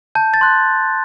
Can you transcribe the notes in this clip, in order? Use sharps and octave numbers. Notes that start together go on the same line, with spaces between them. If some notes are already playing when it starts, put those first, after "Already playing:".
A5 G6
A6
C6 F#6